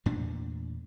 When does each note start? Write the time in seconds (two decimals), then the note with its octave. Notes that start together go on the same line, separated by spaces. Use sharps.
0.06 E2 A#2 A3 D4